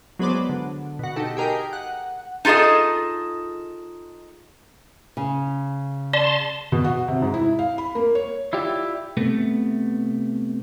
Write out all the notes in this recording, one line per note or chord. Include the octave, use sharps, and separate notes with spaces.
F#3 G#3 B3 B4 C5 D5
D3
B2 F#4
D#4 G4 A4
G4 G#4 A#4 D#5 G5
F#5
D#4 F4 G#4 A4 D#5
C#3
D5 A5 C6
B2
F#4
C3
G#2
E4
F5
B5
A#3
C#5
E4 F4 G4 D5
C3 A3 B3